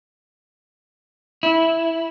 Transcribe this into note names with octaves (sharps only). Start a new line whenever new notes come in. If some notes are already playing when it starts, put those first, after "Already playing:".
E4